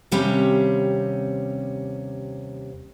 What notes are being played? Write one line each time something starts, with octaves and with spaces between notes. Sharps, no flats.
D#2 C3 G3 C4 C#4